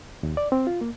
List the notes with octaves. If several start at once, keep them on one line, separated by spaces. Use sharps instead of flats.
D#2
D5
C4
F4
A#3